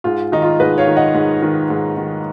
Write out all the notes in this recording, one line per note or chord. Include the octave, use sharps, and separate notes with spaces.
G#2 F4
D#3 D#4
F4
G#2 B4 D#5
C#5 F5
D#3
D#5 F#5
G#2
D#3
G#2
D#3